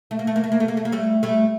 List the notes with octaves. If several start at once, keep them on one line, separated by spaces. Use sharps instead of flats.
A3
A#3
A3
A#3
A3
A#3
A3
A#3
A3
A#3
G3 A3
G3 A3